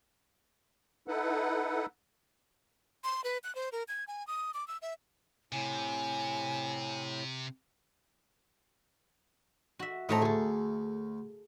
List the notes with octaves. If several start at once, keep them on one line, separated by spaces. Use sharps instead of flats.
D#4 E4 A4 B4 F#5
C6
B4
F#6
C5
A#4
G#6
G#5
D#6
D6
E6
E5
A2 C3 G#5
F#4 E5
A2 A3 C4 D#4 A#5
D2 G#4 A4